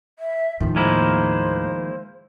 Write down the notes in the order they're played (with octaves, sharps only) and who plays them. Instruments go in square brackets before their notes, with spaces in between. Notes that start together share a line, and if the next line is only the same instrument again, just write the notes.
[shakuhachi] E5
[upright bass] D#2 A2 [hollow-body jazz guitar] D#3 F3
[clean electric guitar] G#3 A#3 E4 [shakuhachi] C5